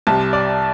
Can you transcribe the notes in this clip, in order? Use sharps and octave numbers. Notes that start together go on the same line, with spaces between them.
C2 C3 G3 A5
D5